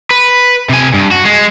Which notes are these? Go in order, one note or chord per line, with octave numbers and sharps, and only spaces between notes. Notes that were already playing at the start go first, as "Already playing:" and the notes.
B4
C3 G#5
G2
F#4
G#3